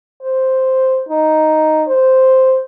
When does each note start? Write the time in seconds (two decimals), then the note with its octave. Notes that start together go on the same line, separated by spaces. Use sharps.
0.23 C5
1.09 D#4
1.88 C5